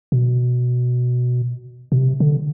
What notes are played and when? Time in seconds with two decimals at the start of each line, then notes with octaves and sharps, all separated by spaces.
0.12 B2
1.92 B2
1.97 C3
2.20 D3